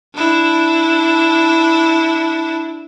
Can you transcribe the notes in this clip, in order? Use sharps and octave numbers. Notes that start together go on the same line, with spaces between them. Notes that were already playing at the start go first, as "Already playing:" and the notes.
D4 E4